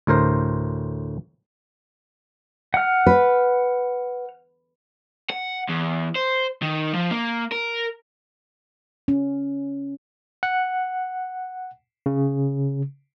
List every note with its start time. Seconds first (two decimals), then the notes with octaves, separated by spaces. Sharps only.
0.07 D2 A2 A#4 C5
2.74 F#5 F6
3.06 B4
5.30 F#5
5.69 E2
6.16 C5
6.62 D#3
6.94 F3
7.11 A#3
7.52 A#4
9.08 C#4
10.43 F#5
12.06 C#3